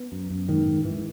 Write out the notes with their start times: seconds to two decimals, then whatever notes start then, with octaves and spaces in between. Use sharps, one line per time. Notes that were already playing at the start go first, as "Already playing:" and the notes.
Already playing: B3
0.12 F#2
0.30 F#2
0.48 G#2 D#3
0.67 G#2
0.85 G#2 E3